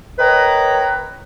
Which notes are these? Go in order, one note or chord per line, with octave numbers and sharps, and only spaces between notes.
A#4 B4 C#5 D#5 G5 A#5